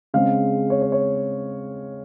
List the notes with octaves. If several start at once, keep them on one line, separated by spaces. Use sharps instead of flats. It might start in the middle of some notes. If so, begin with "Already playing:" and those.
C#3 G#3 C4 F5
C#5
C#5
C#5